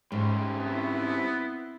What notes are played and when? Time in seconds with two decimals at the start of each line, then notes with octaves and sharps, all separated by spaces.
0.12 G#2 G3 C#4 C5
0.58 B3 C4 E4